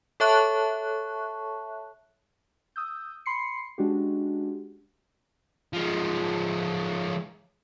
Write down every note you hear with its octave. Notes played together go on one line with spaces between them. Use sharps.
A4 C#5 E5 A5 C#6 F#6
D#6 E6 G6
B5 C6 C7 C#7
G#3 C#4 D4 F#4 G4
F3 G#3